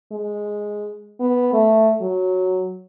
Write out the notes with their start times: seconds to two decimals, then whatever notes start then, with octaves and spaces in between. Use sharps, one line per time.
0.12 G#3
1.20 B3
1.53 A3
2.01 F#3